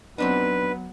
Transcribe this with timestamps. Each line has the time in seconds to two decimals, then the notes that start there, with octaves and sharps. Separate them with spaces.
0.18 F#3 B3 C4 D4 D#4 B4